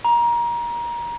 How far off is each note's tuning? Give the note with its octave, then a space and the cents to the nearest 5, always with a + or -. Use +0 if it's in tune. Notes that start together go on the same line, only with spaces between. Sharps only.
A#5 +25